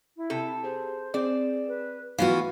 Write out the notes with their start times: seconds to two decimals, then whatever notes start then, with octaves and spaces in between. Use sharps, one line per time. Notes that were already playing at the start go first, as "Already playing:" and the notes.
0.17 E4
0.30 C3 A4
0.64 G4 G#4 C5
1.14 C4 G#4 D5 E7
1.68 B4
2.18 E3 A3 B3 F4 F#4 F5 C#6